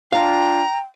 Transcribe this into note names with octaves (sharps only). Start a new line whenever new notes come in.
D4 F4 F5 G5 A#5